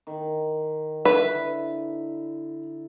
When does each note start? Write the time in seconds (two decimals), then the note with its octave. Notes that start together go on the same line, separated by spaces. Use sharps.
0.07 D#3
1.05 D3 E4 B4